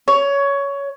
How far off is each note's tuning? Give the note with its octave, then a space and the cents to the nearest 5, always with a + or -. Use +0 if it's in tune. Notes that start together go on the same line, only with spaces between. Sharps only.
C#5 +15